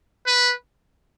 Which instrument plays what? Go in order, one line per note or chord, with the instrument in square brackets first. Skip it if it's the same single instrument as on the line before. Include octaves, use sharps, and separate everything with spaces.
[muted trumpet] B4